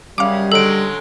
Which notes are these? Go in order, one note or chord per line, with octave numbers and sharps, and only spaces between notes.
F#2 C#3 G3 F5 D6
D3 F#3 G#3 A4 D7